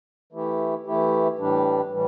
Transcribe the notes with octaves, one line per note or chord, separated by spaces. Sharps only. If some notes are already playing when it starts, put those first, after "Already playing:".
E3 A3 E4 G4
E3 A3 E4 G4
A2 E3 G3 D4 G4
A2 E3 G3